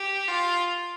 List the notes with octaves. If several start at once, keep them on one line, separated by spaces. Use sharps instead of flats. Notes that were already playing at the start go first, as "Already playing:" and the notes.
Already playing: G4
F4